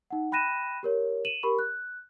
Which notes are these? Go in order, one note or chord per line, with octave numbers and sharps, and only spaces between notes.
D#4 F#5
G5 B5 F#6 A#6 D#7 E7
G4 A#4 C#5
D#7 E7 F#7
G4 A#4 B5 C#6
F#6